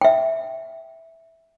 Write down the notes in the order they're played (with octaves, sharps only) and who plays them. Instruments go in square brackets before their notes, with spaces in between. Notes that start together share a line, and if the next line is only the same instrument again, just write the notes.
[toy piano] E5 G5